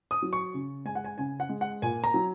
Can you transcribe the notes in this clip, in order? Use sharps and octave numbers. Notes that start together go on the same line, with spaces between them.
D#6
F#3
C#6
C#3
G#3 G#5
F#5
G#5
C#3 G#5
F#5
G#3
F#5
A#2 G#5
A#5
F#3